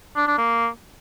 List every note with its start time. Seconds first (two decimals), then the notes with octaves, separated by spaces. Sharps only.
0.16 D4
0.27 D4
0.38 A#3